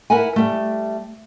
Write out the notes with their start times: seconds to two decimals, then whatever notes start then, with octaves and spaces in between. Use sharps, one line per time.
0.10 E4 A#4 B4 F#5 G#5
0.36 G3 A3